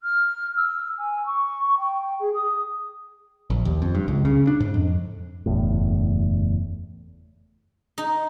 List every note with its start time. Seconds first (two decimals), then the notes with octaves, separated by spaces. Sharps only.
0.02 F6
0.56 E6
0.97 G#5
1.26 C#6
1.78 G5
2.19 G#4
2.33 D#6
3.50 A#1
3.65 D#2
3.82 F2
3.95 G2
4.08 C#2
4.25 C#3
4.47 D4
4.60 G#2
4.74 F2
5.46 F#1 E2 A2
7.98 D#4